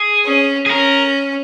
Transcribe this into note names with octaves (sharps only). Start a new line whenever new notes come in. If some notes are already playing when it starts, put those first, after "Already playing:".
Already playing: G#4
C#4
G#4
C#4 A#4